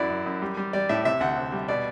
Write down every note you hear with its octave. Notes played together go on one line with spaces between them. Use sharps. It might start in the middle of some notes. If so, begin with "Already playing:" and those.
Already playing: F#2 F#3 E4 D5
F#2
F#2
G3
G3
G3 D5
A2 E5
C3 E5
D2 F#5
C3
G3
B2 D5